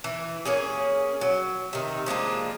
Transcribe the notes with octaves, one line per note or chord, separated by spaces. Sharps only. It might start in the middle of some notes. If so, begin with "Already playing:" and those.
E3
A#3 C#4 G#4
F#3
C3 D#3
F3 G#3 A#3 D4